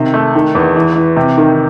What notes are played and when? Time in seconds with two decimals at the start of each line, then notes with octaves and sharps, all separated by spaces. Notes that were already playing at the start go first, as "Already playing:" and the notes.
Already playing: C3 D#3
0.14 A3
0.35 D#3
0.55 E2
0.76 E3
0.96 E3
1.16 C3
1.37 D#3